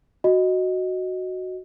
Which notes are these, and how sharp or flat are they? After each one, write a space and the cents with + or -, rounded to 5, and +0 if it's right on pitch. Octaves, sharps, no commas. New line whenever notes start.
F#4 +0 D#5 +0